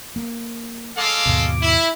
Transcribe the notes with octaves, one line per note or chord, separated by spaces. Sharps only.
A#3
G#3 A4 F5 D6
D#2 G#2 B2
E4